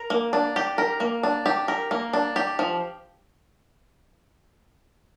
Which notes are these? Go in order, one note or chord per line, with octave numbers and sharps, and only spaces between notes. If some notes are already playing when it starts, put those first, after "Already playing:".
Already playing: A#4
A#3
D4
G4
A#4
A#3
D4
G4
A#4
A#3
D4
G4
F3